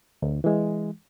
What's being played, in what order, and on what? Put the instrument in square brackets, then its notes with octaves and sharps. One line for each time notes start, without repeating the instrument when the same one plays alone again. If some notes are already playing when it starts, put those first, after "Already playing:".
[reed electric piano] D2
E3 G#3